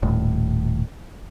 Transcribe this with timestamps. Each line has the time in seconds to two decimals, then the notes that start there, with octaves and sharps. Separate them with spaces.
0.03 D#1 A2